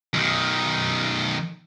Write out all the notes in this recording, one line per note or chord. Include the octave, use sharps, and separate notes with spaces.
B1 D#3